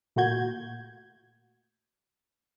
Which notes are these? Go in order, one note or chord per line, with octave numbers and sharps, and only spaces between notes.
A#2 A3 A#3 F#4 G6 G#6